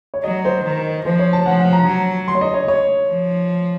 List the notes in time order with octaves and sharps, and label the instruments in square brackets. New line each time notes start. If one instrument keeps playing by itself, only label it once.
[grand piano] C#5
[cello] F#3 [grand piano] D#5
[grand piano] C5
[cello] D#3
[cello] F3 [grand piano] C5
[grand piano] C#5
A5
[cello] F3 [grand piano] F#5
[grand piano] F#5
A#5
[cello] F#3
[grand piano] C6
C#5
D#5
C#5
C#5
[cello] F3